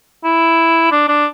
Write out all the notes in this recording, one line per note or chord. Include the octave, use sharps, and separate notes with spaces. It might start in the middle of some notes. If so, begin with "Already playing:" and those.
E4
D4
D4